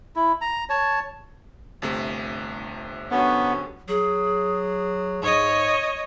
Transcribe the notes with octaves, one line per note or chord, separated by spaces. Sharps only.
E4
A#5
C#5 A5
G1 C3 A3
D3 F#3 B3 C#4
F#3 G#4
G#2 C#5 D#5